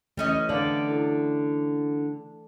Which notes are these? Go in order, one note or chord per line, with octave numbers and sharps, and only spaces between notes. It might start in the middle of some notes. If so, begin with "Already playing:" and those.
E3 G3 A3 C#4 D#5
D3 D5 F5 F#7
E4 A4